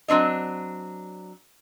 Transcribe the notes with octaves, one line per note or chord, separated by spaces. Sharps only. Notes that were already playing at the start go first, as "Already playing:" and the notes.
F#3 C4 D4 D#5